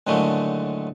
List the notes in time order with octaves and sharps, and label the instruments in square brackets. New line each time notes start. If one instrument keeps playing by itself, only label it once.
[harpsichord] D#2 A2 D3 F#3 G#3 A3